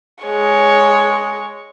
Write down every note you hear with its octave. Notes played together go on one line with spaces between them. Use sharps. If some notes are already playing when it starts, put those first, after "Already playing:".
G#3 C#5